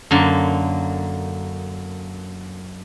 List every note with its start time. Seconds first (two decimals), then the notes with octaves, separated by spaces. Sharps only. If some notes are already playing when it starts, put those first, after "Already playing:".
0.11 F#2 D3 A#3